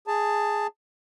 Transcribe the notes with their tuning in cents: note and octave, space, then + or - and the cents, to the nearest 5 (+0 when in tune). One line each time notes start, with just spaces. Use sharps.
G#4 +0 A5 +10